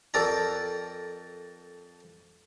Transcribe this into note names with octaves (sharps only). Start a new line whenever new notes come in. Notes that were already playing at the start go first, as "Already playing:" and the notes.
F2 A4 A#4 D5 A#5